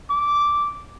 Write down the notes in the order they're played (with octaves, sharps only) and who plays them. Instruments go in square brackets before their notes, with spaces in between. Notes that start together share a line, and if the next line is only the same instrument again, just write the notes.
[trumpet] D6